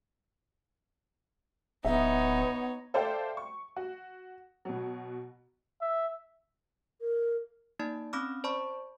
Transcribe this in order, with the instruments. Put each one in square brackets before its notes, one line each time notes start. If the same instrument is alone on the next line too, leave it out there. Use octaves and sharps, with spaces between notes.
[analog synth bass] D1 [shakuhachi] B3 [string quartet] D#4 C#5 [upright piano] E5
[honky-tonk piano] A4 C5 D5 E5 F5 G5
C#6
F#4
B2 F#3
[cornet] E5
[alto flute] A#4
[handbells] A#3 D#4 D5 A5
C4 C#4 B5 D6 D#6 F6
C5 D5 A5 B5 C#6